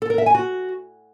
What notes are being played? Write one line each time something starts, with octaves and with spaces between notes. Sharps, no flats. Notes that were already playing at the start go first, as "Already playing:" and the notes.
A4
A#4
E5
G#5
F#4